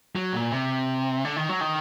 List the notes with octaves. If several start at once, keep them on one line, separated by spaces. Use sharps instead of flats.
F#3
A#2
C3
D3
D#3
F#3
D#3